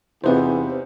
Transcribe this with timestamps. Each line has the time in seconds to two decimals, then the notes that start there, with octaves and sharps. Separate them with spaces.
0.24 E2 C3 C4 D#4 F4 B4 C5